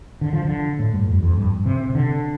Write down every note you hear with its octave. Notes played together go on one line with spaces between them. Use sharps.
D3
F3
D3
A2
G2
F2
F2
G2
C3
C3
D3